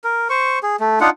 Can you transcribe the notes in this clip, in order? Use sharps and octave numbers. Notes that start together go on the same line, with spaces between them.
A#4
C5 C#6
G#4
A3
D4 D#4 F4 F#5